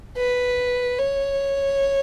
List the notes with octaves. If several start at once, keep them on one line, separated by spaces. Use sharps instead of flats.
B4
C#5